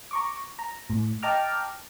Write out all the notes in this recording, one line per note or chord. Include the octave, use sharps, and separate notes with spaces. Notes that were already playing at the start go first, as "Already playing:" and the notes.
A#5 C#6 D6
A#5
A2
D#5 G5 A5 A#5 D6 F6